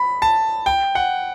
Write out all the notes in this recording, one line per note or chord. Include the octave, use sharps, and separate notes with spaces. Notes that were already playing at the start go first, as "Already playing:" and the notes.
Already playing: B5
A5
G5
F#5